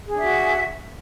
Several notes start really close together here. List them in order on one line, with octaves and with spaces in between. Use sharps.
G#4 D4 E5 F#4